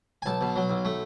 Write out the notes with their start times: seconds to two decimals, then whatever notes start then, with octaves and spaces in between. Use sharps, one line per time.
0.22 G#5
0.26 B1 A5
0.41 B2
0.56 F#3
0.69 B1
0.85 A3